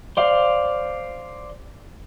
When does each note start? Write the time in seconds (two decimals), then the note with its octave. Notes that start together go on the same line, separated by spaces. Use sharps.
0.17 C5 D5 F5